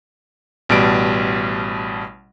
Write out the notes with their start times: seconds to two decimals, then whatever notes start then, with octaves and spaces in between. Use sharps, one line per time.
0.69 A1 B2 G3 D7